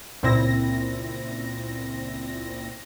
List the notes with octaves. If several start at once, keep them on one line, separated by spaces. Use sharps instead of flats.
C#2 A#2 C4 E4 A#6